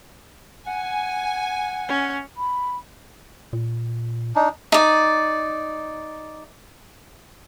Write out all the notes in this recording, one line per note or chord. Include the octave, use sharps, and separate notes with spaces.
F#5 G#5
C#4
B5
A#2
D4 D#4
D#4 D5